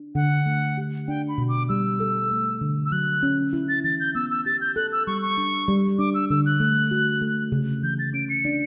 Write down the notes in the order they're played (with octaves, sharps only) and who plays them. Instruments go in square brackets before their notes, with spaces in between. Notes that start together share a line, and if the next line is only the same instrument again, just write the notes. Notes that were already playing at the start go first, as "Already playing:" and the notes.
Already playing: [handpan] D4
[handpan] D3 [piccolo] F#5
[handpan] A3
G4
[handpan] D4 [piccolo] G5
[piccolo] B5
[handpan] B2
[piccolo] D6
[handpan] G3 [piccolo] E6
[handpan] A4
A3
D3
[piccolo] E6
[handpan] F#3 [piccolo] F#6
[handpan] C#4
E4
[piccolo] A6
[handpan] E3 [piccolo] A6
[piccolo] G6
[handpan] B3 [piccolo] E6
[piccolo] E6
[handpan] G4 [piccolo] A6
[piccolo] G6
[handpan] A4 [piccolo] F#6
[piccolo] E6
[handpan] G3 [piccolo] C#6
[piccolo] C#6
[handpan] D4
G3
[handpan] D4 [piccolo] D6
[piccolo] E6
[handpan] D3 [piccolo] E6
[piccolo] F#6
[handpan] A3
F#4
A3
C#3
[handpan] E3 [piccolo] G6
[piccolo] A6
[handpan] C#4 [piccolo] D7
[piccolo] C#7
[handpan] D4